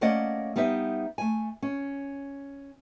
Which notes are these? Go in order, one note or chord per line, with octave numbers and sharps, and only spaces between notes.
A3 A#3 C#4 D5 D#5 F#5
G3 B3 D#4 C5 E5
A3 G#5
C#4